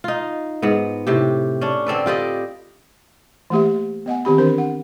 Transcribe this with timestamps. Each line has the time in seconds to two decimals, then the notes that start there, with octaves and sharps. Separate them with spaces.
0.04 D#4 F4
0.62 G#2 B3
1.07 A2 C3 G4
1.61 C#4 D4
1.87 D3 C4 A4 B4
2.06 F4 G4 D5 D#5
3.50 E3 A3 A#3 G4 E5
4.06 B3 D#5 F#5 G#5
4.25 D#3 C4 G4 B5
4.38 E3 D4 A#4 C5
4.58 F#5